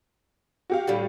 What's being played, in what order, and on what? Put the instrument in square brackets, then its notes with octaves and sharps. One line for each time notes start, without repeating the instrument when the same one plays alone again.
[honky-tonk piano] F#4 G4 F5
[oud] A2 D3 G3